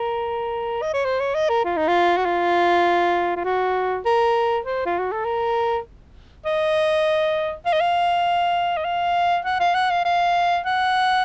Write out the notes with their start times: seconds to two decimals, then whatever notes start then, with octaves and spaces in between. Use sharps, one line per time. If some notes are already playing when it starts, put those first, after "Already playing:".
Already playing: A#4
0.82 D#5
0.94 C#5
1.05 C5
1.20 C#5
1.35 D#5
1.49 A#4
1.64 F4
1.77 D#4
1.88 F4
2.17 F#4
2.25 F4
3.37 F4
3.45 F#4
4.05 A#4
4.65 C5
4.86 F4
4.99 F#4
5.12 A4
5.25 A#4
6.45 D#5
7.65 F5
7.73 D#5
7.81 F5
8.77 D#5
8.85 F5
9.45 F#5
9.60 F5
9.75 F#5
9.90 F5
10.05 F5
10.66 F#5